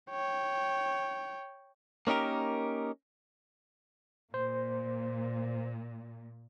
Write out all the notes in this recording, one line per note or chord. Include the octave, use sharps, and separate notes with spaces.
C#5 G5
A#3 C#4 D#4 G4 A#4
A#2 C5